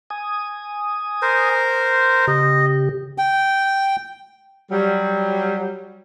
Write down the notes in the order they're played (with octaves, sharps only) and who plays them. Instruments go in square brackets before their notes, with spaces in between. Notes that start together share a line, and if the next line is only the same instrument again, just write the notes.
[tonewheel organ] G#5 D#6
[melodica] A#4 C5
[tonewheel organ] C#3 G4 [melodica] D#5
[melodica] G5
[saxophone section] F#3 G3